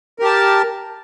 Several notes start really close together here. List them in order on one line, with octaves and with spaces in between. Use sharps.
A#4 G4 A5